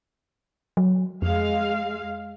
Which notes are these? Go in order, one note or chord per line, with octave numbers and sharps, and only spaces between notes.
F#3
F2 G#3 F5